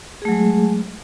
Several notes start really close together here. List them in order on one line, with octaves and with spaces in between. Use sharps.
G#4 A3 F#3 G#3